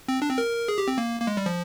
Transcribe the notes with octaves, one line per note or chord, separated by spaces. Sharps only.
C4
D4
C4
A#4
G#4
G4
C4
A#3
A#3
G#3
G3
F3